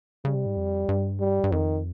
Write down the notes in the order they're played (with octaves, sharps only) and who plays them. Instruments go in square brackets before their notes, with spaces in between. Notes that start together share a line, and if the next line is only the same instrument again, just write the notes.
[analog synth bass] C#3 [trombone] G3
[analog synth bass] C3
G#2
F2
G2
[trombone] G3
[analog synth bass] G2
[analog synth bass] F2 [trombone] D#3